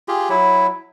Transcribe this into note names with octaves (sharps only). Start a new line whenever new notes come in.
F4 G4 G#4
F#3 E4